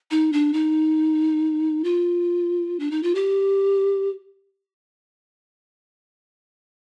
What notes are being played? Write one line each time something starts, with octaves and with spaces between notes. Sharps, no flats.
D#4
D4
D#4
F4
D4
D#4
F4
G4